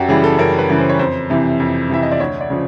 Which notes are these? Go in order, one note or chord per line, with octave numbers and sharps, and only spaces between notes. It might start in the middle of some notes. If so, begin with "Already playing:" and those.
Already playing: F#2 F#4 G4
C#3 E3 G3 G#4
A4
F#2 A#4
B4
C#3 E3 G3
C5
C#5
F2 C5
C3 E3
F2
C3 E3 E5
D#5
D5
D2 C#5
D5
C#3 F3